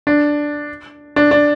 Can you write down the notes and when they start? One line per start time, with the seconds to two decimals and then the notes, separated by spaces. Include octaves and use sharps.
0.07 D4
1.16 D4
1.31 D4